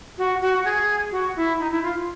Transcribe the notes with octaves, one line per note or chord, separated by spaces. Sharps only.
F#4
F#4
G#4
F#4
E4
D#4
E4
F4